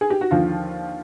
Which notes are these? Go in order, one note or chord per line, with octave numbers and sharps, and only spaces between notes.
G#4
G4
F#4
D#2 D3 F3 F4